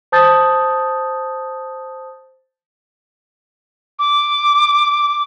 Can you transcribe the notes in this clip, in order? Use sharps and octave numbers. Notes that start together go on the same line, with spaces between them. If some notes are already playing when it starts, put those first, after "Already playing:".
C5 A5 D#6 G6 A6
D6